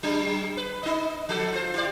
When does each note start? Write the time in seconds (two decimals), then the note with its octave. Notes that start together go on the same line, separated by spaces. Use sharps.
0.03 F#3 G#3 D4
0.57 B4
0.83 D#4 D#5
1.29 F3 A4
1.52 F4 C5
1.74 E4 G4 D5